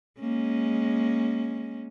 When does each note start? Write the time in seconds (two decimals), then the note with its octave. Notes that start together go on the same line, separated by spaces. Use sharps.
0.20 G#3 A#3 C#4